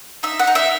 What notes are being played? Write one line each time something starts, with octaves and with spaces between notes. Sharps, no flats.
D#4 E5
F#5
D#4
E5